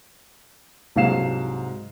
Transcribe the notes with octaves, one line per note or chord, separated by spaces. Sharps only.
C2 G#2 F#3 F5 C7 E7